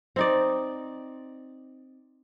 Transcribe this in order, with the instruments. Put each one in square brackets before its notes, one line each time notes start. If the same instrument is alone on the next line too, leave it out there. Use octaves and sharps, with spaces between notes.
[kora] C4 D#4 D5